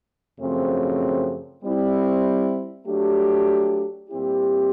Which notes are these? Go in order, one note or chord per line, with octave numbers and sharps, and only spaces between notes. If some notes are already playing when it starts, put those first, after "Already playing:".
F#2 C#3 F3 A3 C4
G3 C4 E4
F#3 A3 D4 G4
A#2 G3 C4 E4 G4